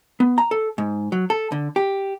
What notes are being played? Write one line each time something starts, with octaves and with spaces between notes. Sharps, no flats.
B3
A#5
A4
G#2
F#3
A4
D3
G4